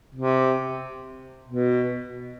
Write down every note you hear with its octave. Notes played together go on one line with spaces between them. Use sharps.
C3
B2